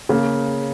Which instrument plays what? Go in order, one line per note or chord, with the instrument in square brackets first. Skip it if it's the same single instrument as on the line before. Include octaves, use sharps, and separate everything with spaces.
[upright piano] C#3 A#3